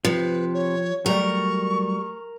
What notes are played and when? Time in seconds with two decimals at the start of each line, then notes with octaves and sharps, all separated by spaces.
0.05 C3 F3 B4
0.54 C#5
1.06 F#3 G3 A3 A#4 C#6